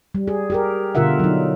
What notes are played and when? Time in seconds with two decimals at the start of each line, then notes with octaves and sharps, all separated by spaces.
0.15 G3
0.28 G#4
0.50 G4 G#4 A#4
0.95 B2 D3 F4 A#4 E5 F#5
1.20 F#3 D#4